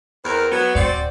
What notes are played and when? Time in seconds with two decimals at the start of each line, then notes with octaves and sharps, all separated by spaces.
0.25 E2 C4 A#4
0.52 F#3 B3
0.75 D1 C4 F#4 D5